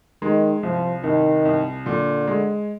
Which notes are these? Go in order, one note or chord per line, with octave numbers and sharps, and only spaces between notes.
D#3 G#3
C2 F3
C2 D#3
C2
A#2 D3
G#3